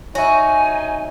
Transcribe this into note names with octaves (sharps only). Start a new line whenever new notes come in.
D#4 F#4 C#5 E5 G#5